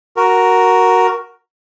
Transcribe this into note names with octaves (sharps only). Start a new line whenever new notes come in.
F#4 A#4